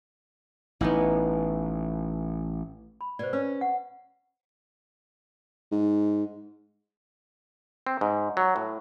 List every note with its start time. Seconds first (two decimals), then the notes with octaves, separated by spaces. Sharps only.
0.81 A1 B3 D#4 E4
3.01 B5
3.19 B2 C5 D5
3.33 C#4 B4
3.61 F#5
5.71 G#2
7.87 C4
8.01 G#2
8.37 F#3
8.56 A2